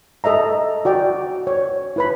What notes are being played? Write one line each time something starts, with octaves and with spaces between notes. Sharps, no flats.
A4 D#5 E5 A#5
F#4 D5 G5
C#5
E4 B4 B5